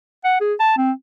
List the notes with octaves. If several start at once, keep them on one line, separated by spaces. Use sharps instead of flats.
F#5
G#4
A5
C4